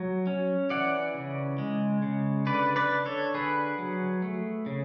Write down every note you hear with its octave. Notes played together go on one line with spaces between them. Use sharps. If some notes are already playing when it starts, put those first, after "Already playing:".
Already playing: F#3
C#4
E3 D5 F#5
C#3
G#3
C#3
D3 B4 D5
B4 D5
D4
A4 C#5
D3 G#4 B4
F#3
A3
C#3